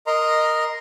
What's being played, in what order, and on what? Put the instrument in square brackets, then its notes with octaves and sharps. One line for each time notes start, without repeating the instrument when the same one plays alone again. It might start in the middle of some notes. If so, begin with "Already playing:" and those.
[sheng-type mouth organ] A#4 D#5 A#5 C6